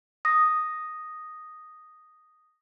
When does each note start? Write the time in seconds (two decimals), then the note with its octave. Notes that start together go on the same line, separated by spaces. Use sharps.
0.25 D#6 A#6